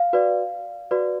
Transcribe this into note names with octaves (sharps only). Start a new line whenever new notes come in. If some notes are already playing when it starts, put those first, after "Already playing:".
Already playing: F5
F#4 B4 D5
F#4 B4 D5